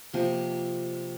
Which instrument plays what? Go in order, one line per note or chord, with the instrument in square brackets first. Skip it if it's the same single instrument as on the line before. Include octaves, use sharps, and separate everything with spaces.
[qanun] C3 F3 A#3